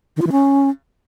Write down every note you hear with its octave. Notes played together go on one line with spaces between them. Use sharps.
D#3
F4
E3
C#4